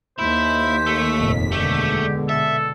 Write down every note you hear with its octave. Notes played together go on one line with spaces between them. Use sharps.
D#2 E4 C5 B6
A3
F1 F2 A#2
B2 D3 G#3 A3 G4
A4 E5